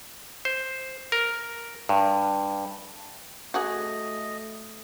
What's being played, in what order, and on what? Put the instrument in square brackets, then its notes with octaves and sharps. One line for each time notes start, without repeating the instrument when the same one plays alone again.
[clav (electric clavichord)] C5
A#4
G2
[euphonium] A3 [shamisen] F#4 G#4 [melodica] D#5